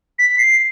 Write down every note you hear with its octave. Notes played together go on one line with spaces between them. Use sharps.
B6
C7